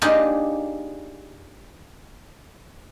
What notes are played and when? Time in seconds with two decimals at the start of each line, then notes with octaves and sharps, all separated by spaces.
0.02 A#3 D4 D#4 F4 G4 G#4